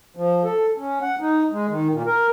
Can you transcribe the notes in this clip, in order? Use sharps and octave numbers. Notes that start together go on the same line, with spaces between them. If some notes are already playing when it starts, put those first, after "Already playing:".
F3
A4
C#4
F#5
D#4
G#3
D#3
A#2
A#4